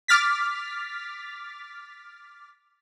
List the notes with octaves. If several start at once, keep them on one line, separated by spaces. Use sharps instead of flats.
D6 F6 A6 B6